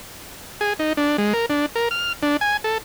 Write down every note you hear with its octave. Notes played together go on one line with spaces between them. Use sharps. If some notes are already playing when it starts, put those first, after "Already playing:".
G#4
D#4
D4
G#3
A#4
D4
A#4
F6
D4
G#5
A4